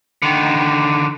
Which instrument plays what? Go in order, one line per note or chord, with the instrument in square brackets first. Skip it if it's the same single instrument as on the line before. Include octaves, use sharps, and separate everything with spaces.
[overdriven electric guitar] D3 D#3